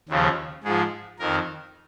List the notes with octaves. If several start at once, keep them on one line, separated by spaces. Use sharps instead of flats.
D#2 C#3 F3
G#2 F3 G#4
F2 D#3 A#4